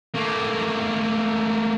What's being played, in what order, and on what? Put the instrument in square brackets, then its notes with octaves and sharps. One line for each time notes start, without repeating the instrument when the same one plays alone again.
[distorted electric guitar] A3 A#3